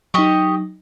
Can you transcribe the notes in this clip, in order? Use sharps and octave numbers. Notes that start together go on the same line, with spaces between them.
F#3 D#4 G4 D#5 C#6